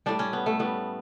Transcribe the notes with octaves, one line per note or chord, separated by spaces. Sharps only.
A2 G3 D4
C#4
B3
A3
A2 G3 B3